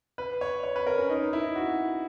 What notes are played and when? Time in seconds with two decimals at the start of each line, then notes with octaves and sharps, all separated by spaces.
0.18 B4
0.41 C#5
0.64 C#5
0.76 B4
0.87 A#4
0.98 C#4
1.10 D#4
1.33 E4
1.56 F#4